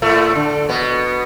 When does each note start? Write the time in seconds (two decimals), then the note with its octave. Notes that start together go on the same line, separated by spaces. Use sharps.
0.02 A2 A3
0.35 D3
0.69 B2 B3